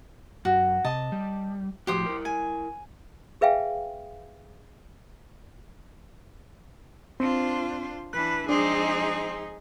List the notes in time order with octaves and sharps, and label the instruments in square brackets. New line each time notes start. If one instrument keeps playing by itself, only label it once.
[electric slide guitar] F#2 [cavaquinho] F#4
[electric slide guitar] C3 [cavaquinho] D#5 A5 D#6
[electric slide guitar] G3
[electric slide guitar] A2 F3 F#4 [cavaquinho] G4 C5 D#6
[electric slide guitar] E4 A#4
[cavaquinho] G#5
[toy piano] G#4 B4 E5 F5 G5 G#5
[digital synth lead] C4 [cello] D4 F4 [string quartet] C5
[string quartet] E3 [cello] D4 B4 [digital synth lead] F#6
[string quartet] F3 G#3 C4 [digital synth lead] D4 [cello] D#4 G#4